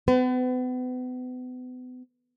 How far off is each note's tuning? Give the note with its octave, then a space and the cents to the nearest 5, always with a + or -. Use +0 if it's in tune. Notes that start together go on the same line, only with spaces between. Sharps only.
B3 +35 B4 +45